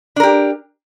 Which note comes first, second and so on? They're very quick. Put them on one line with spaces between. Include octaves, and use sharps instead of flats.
D4 A#4 G4